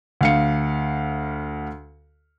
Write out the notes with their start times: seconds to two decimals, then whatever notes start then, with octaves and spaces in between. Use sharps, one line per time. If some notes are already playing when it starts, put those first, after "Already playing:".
0.21 D2 F5 C#7